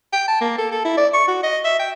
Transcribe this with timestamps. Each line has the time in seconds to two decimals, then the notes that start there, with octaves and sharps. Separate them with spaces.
0.13 G5
0.28 A5
0.41 A#3
0.58 A4
0.72 A4
0.85 E4
0.97 D5
1.14 C#6
1.28 F#4
1.43 D#5
1.65 E5
1.79 G5